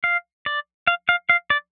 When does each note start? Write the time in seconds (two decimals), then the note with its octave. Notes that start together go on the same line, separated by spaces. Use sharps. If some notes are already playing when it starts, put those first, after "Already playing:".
0.04 F5
0.46 D5
0.87 F5
1.09 F5
1.30 F5
1.50 D5